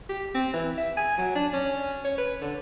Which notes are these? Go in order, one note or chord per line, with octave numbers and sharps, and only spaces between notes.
G4
C4
E3
E5
G#5
F#3
D4
C#4
C#5
B4
D3